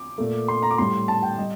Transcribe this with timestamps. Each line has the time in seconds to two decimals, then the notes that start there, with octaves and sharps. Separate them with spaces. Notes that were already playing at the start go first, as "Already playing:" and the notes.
Already playing: D6
0.18 A#2 A3
0.48 C6
0.62 A#5
0.71 D6
0.78 A2 G3 C6
1.08 A5
1.23 G5
1.38 G3 D#5